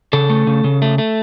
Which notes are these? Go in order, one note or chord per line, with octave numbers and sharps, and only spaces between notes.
C#3 A4
A3
C#3
C#3
A3
A3